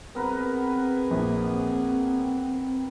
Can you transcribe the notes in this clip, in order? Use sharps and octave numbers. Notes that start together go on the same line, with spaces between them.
B3 C4 G#4 A#4 B4
A#1